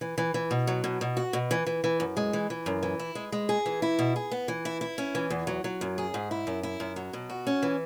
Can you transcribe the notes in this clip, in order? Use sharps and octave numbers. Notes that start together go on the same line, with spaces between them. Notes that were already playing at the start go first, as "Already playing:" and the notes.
E3
E3
E3
B2
F#3
B2
B2
F#4
B2
E3
E3
E3
F#2
G#3
E3
E3
F#2
E3
E4
G#3
G#3
G#4
E3
E4
B2
G#4
B3
E3
E4
E4
C#4
E3
E2
F#3
F#3
F#2
G#4
G#2
E4
F#2
E4
F#2
F#3
B2
F#4
C#4
E3